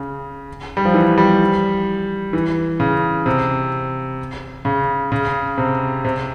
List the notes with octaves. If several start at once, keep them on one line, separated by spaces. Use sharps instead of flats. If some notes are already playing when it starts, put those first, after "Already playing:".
Already playing: C#3
G3
F3
E3
G3
E3
C#3
C3
C#3
C#3
C3
C3